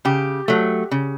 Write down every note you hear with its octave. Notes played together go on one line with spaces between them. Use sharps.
C#3 G4
F#3 A3
C#3